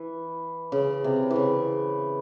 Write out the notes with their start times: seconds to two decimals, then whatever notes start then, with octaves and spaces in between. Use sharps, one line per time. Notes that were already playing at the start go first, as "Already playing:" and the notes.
Already playing: E3
0.72 C#3
1.04 C3
1.31 E3
1.36 C#3